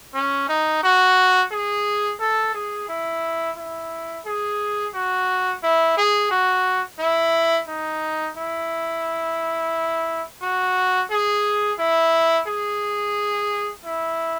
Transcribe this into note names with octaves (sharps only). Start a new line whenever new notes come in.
C#4
D#4
F#4
G#4
A4
G#4
E4
E4
G#4
F#4
E4
G#4
F#4
E4
D#4
E4
F#4
G#4
E4
G#4
E4